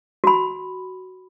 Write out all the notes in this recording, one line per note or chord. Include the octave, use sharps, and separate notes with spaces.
F#4 B5